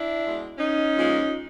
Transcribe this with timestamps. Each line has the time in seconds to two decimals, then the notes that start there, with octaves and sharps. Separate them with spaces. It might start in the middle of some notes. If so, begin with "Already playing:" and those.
Already playing: D4 E4
0.23 B2 G#3
0.59 C#4 D#4
0.94 A#2 F3 G#3